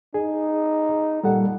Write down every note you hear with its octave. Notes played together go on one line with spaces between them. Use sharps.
D#4 G#4
A#2 G3 A4 F#5